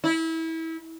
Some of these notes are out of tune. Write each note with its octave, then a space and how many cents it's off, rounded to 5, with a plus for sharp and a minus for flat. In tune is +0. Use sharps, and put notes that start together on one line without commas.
E4 -25